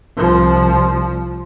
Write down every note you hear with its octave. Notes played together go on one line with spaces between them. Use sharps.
C2 F3